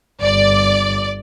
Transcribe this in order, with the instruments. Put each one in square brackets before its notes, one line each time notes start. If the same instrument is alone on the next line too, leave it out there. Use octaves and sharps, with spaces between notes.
[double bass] G1 [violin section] D5